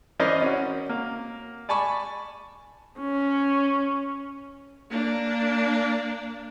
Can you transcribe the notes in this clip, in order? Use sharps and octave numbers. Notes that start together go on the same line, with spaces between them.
E3 C#4 A#4 C5 D5 D#5
C#4 F#4
A#3
D5 G#5 A5 B5 C#6
C#4
A#3 D4